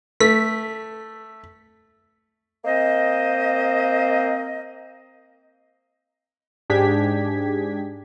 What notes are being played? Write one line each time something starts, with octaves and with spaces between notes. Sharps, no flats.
A3 B6
A#3 C4 C5 D#5
G#2 D4 G4 G#4 G#6 B6